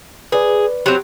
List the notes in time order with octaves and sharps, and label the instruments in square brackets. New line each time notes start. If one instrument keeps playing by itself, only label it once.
[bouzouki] G#4 [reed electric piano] B4 D5
[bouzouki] F#3 C4 [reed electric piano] G4